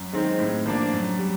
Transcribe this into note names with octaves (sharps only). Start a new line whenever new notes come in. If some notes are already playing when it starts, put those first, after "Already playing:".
Already playing: F#2
D#3 G#3 C4 D#4
A2
F3 A#3 D4
F#2
G3